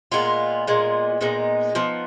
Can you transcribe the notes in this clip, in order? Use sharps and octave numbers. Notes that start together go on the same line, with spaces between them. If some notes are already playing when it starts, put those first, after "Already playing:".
A#2 G#3 B3 F4
A#2 G#3 B3
A#2 G#3 B3 D#4
F3 B3